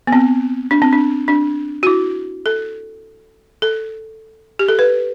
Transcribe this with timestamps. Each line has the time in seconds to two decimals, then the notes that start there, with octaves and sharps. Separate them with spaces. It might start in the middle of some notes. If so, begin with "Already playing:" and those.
0.07 B3
0.13 C4
0.71 D4
0.82 C4
0.93 D4
1.28 D4
1.83 F#4
1.87 E4
2.46 A4
3.62 A4
4.59 G4
4.68 A4
4.79 B4